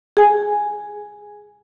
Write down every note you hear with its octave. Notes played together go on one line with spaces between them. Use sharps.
G#4 G#5